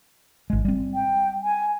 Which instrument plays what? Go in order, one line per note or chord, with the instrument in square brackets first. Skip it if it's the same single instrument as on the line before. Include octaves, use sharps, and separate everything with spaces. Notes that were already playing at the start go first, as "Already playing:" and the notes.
[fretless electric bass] G#1 G#3
G3 C4
[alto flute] G5
G#5